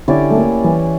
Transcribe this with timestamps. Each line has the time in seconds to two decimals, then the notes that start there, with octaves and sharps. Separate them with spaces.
0.08 D3 C#4 E4 G4 D5
0.31 A3
0.36 A#3
0.64 E3